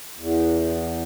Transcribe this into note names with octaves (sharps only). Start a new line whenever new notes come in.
E2